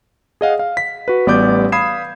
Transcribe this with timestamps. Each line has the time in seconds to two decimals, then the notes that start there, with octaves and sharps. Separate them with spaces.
0.41 G#4 D#5 F5 F#5
0.59 F5
0.77 B6
1.08 F#4 B4
1.27 A1 G3 B3 D5 D6 G6
1.72 F5 B5 D#6 G#6 C7 E7